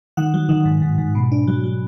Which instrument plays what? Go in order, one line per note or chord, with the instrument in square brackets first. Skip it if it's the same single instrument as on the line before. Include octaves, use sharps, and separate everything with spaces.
[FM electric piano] D#3 F#5
F#3
D#3
G#2
G#2
G#2
B2
D4
F#3
F#3